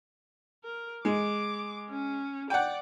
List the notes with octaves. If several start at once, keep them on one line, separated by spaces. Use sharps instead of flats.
A#4
G#3 D6
C#4
D5 F#5 G5